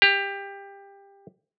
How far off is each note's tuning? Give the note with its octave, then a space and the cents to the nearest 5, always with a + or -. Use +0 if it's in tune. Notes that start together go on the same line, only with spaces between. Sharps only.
G4 +20